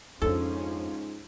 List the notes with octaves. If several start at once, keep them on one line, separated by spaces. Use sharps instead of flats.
F2 G#2 F3 C#4 D4 A4